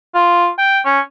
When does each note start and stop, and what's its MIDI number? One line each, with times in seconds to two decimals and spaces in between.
0.15 0.48 65
0.58 0.80 79
0.85 1.00 61